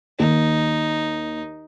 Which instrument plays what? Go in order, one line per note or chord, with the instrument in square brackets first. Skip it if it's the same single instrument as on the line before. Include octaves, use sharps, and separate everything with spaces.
[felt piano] D#2 [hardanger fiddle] D#4